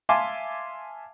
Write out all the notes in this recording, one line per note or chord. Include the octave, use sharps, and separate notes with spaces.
E5 F5 G#5 A5 C6 D6